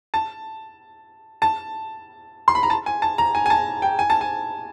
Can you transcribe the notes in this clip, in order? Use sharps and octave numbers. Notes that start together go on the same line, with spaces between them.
A5
A5
C6
B5
A#5
A5
G#5
A5
A#5
G#5
G#5
A5
G5
G#5
A5
G#5